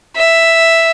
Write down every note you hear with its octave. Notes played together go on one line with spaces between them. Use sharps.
E5